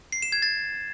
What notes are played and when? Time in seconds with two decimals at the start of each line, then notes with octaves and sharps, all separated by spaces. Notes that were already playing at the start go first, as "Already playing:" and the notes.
0.12 C7
0.22 E7
0.32 G#6
0.42 A6